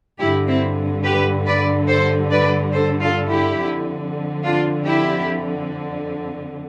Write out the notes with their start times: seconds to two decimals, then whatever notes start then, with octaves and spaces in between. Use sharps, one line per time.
0.19 G2 D3 E4 G4
0.47 C4 E4
1.03 G4 B4
1.46 B4 D5
1.88 A4 C5
2.30 B4 D5
2.73 A4 C5
3.01 F4 A4
3.29 E4 G4
3.58 F2 D3
4.43 D4 F4
4.85 E4 G4